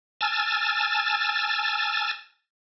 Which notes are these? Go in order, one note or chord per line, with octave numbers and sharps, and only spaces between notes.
G#5 A5 E6 F6 A6